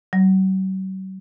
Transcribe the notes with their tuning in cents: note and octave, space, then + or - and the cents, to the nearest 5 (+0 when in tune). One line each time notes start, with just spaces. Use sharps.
F#3 +45